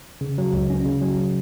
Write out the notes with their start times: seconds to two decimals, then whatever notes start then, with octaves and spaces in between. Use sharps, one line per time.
0.21 C#3
0.38 F#3
0.53 C#2
0.70 C#4
0.86 C#3
1.01 F#3